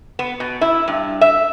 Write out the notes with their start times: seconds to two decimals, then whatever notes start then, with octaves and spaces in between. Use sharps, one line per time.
0.19 B3
0.40 B2
0.61 E4
0.88 G2
1.21 E5